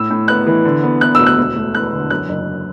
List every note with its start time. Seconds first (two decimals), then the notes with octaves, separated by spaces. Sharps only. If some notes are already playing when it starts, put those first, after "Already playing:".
Already playing: A2 E6
0.10 A2
0.28 B3 F#6
0.47 E3
0.65 D3
0.83 B3
1.01 B3 F#6
1.15 D2 E6
1.26 F#6
1.38 E1
1.56 A3
1.75 E2 F#6
1.92 D3
2.10 F#2 F#6
2.29 F#1